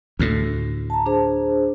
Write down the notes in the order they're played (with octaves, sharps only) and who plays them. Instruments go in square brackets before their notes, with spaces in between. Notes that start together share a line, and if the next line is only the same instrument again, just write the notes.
[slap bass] D2 A2
[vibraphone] A5 A#5
D4 G#4 C5